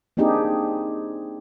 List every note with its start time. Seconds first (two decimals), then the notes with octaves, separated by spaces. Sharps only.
0.17 A#3 C4 D4 D#4 G4 G#4